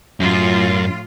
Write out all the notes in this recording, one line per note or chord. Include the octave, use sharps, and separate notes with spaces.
F#2 A2 F4